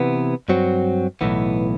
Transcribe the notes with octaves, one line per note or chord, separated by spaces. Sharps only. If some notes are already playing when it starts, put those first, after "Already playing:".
Already playing: C3 E3 B3
G2 F#3 C4 F#4
B1 A2 E3 B3